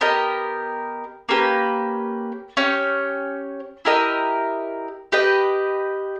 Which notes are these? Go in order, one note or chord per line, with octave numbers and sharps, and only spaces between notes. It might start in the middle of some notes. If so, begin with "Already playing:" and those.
B3 G4 A#4 D#5
A#3 C#4 G4 B4
C#4 G4 C#5
E4 G4 A#4 D#5
G4 B4 D#5 G5